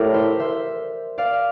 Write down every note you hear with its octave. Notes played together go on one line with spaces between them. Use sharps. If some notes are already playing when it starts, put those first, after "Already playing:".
Already playing: A2 G4 A#4 D5
C5 E5
C5 E5
D5 F5